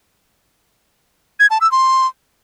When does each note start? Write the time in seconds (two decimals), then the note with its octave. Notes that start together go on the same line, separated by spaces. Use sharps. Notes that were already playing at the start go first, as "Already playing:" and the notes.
1.40 G#6
1.50 A5
1.61 E6
1.72 C6